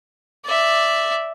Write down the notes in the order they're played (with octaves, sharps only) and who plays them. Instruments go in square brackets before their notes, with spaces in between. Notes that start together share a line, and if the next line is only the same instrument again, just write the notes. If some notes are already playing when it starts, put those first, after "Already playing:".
[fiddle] D5 E5